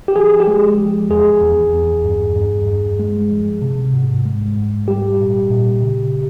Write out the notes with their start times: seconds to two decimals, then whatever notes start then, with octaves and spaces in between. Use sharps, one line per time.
0.08 G4
0.16 F3 G#4
0.40 G4
0.47 G#3 G#4
0.78 F3
1.10 E2 G#4
1.41 E2
1.73 E2
2.04 G2
2.36 G2
2.67 G2
2.99 G#3
3.31 F3
3.62 C3
3.93 G#2
4.25 G#3
4.56 G#2
4.88 G3 G4
5.19 A#2
5.51 A#2
5.82 C#3